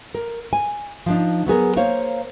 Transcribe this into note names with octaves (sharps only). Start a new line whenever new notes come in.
A#4
G#5
F3 D4 D#4
F#3 B3 G#4 A#4
A#3 C5 C#5 F5